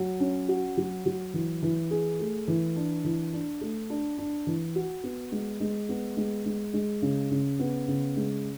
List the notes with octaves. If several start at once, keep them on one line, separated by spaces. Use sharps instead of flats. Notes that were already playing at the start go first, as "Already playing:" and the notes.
Already playing: F#3
C#4
F#4
F#3
F#3
E3
E3
G#4
A3
E3
D4
E3
D4
A3
D4
D4
E3
F#4
B3
G#3
G#3
B3
G#3
G#3
G#3
C#3
C#3
B3
C#3
G#3